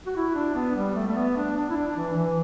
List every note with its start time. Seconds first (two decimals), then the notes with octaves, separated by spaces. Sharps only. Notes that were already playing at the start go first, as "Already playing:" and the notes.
0.06 F#4
0.16 E4
0.35 D4
0.55 B3
0.76 G3
0.95 A3
1.07 A3
1.15 B3
1.36 D4
1.56 D4
1.70 E4
1.76 D4
1.97 E3
2.16 E3